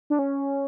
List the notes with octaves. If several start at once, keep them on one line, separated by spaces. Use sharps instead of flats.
D4
C#4